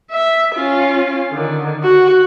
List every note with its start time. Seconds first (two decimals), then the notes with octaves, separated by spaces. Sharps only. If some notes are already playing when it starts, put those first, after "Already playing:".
0.11 E5
0.55 C#4 F4
1.32 D3 D#3
1.83 F#4